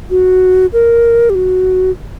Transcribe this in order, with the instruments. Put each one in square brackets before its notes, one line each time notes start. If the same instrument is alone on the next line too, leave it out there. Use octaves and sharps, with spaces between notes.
[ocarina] F#4
A#4
G4
F#4